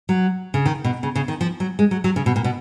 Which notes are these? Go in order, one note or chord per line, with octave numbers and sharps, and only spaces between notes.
F#3
C#3
D#3
B2
C#3
C#3
D#3
F3
F#3
G#3
F#3
F#3
C#3
B2
A#2
B2